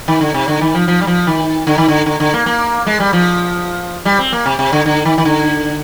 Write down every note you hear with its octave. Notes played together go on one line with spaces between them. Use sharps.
D#3
D3
C3
D3
D#3
F3
F3
G3
F3
D#3
D3
D#3
D3
D3
D3
A#3
A#3
G#3
G3
F3
G3
C4
A#3
C3
C3
D3
D3
D#3
D#3
D3